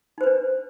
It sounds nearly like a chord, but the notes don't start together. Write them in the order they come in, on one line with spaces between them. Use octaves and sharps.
D#4 C5 B4 D4